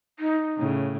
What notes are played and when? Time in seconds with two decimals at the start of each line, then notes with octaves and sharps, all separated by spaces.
0.19 D#4
0.58 A2 C#3